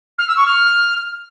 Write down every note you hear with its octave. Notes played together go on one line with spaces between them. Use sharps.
F6
E6
C#6
F6